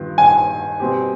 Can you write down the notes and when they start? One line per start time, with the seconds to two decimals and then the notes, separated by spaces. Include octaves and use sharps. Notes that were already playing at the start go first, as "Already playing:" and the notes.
Already playing: G2 D#3 G3 B3 F4
0.18 G#5
0.80 B2 G3 C4 G4